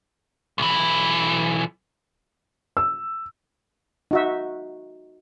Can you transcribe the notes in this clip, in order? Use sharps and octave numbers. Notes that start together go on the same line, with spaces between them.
B1 E3
E6
D#4 F#4 E5